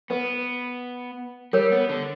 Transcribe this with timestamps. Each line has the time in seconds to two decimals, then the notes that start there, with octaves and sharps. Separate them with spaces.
0.10 B3 B4
1.53 G3 A#4 C#5
1.72 B3
1.89 D3